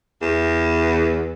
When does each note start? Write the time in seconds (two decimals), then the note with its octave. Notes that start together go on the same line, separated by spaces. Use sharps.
0.22 E2